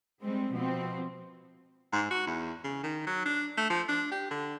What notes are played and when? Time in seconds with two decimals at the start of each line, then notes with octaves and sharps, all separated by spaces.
0.21 G3 G#3 C4
0.52 B2 F3 C4
1.92 G#2
2.10 F#4
2.26 E2
2.64 C#3
2.83 D#3
3.06 F#3
3.25 D4
3.57 A3
3.70 F3
3.88 D4
4.11 G4
4.31 D3